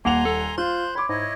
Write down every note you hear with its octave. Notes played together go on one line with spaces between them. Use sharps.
D#1 A#3 F#5 G#5 A#5 C6 F7
A4
F4 C5 C6 F#6 G6
C#5 B5 D6
G#2 E4 C#5 D#5